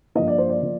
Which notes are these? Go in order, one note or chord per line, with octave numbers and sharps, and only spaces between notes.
G2 F3 A#3 D#5
D5
C5
D5
F3 A#3